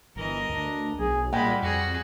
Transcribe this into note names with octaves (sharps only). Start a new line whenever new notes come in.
G1 E3 A#4 D#5
D2 D4
B1 G#4
A#2 G3 G#3 F#5 G5 B5
F2 F#4 G#4